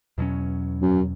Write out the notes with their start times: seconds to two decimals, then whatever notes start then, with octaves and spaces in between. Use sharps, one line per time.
0.18 E2 B2 F#3 C#4
0.82 F#2